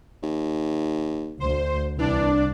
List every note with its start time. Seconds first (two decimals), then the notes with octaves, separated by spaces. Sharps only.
0.23 D#2
1.40 D2 C5
1.99 C2 E3 D4 D5